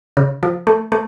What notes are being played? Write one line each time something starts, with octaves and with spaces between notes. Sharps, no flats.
C#3
F3
A3
A3